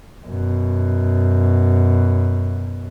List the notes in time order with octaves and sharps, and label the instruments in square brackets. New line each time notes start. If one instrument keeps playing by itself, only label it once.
[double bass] F#2 B2